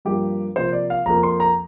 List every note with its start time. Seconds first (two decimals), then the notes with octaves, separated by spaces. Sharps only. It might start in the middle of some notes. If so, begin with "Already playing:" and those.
0.05 G2 F3 A#3 G4
0.56 C3 F3 A#3 C5
0.73 D5
0.90 F5
1.06 F2 F3 A#3 A#5
1.23 C6
1.40 A#5